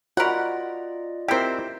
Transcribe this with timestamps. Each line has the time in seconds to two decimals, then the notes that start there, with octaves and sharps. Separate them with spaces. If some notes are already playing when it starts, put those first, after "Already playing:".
0.17 F4 F#4 A#4 C5 D5 D#5 F#5 B5
1.28 C4 E4 G4 A#4 C5 E5 G5